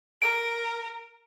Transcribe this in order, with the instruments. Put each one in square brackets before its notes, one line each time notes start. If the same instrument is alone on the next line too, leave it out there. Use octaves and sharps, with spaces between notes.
[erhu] A#4 [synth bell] D7